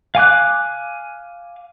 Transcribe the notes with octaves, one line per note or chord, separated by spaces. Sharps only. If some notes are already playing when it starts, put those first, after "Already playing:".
F5 G#5 D6 F#6